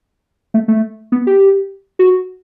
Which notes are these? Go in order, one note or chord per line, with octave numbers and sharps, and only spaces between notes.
A3
A3
B3
G4
F#4